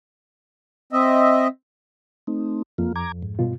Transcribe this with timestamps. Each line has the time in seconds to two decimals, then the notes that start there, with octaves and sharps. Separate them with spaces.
0.93 C4 D#5 E5
2.27 A3 C4 D#4
2.78 F2 A#3 F4
2.96 A#5 D6 G#6
3.23 G#2
3.39 G2 B2 F4